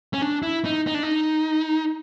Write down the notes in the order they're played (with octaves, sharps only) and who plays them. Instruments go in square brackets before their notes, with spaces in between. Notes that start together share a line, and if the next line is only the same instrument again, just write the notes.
[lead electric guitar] C#4
D4
E4
D#4
D#4
D4
D#4